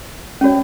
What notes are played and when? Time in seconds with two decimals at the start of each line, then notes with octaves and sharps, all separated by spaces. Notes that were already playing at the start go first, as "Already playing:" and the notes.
0.41 C#4 F#4 C#5